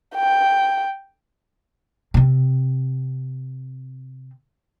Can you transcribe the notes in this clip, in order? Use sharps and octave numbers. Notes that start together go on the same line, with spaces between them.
G5
C3 C4